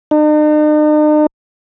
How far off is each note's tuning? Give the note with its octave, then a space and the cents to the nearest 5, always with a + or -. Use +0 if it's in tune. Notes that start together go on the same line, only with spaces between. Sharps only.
D#4 -45